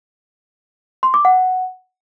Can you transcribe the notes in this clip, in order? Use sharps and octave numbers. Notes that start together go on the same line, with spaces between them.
C6
D6
F#5